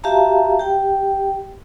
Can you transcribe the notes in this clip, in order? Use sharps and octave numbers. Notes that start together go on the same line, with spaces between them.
F#4 G4 E5 F5 A5 A#5
G4 G5